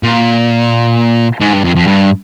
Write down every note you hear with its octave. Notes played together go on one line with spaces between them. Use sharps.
A#2
G#2
G2
F2
F2
G2